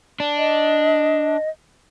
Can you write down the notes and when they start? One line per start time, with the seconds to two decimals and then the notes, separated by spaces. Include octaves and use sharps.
0.20 D4
0.38 D#5